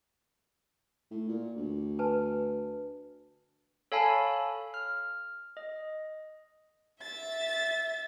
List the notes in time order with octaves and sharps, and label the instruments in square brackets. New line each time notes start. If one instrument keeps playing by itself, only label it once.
[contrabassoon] A2
A#2
D2
[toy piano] B4 G#5 A5
[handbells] A4 C#5 F5 G#5 A5 B5
F6
D#5
[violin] E5 A6